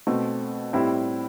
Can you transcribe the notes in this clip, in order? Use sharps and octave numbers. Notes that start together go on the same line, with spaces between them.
B2 A3 C4
A2 G3 C4 E4